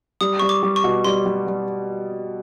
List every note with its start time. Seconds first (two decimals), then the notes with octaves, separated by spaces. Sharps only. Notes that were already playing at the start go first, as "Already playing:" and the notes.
0.21 G3 D#6
0.39 G3 C#6
0.49 D6
0.63 G3
0.76 C#6
0.84 B2
1.04 G3 C6
1.26 G3
1.47 G3